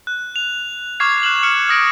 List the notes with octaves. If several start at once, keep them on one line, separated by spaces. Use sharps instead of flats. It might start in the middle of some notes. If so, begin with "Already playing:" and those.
F#6
F7
C#6 D6 F6 G#6 C7
F#6 E7 F#7
F6 C#7
D#6 A#6 D7